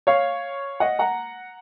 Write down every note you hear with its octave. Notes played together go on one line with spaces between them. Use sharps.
C#5 F5
D#5 F#5
F#5 A#5